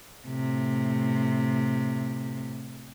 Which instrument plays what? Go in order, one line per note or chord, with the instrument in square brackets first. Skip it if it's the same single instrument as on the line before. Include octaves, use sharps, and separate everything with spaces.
[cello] A2 C3